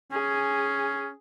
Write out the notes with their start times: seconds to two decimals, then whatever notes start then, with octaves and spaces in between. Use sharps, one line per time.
0.12 C#4 G#4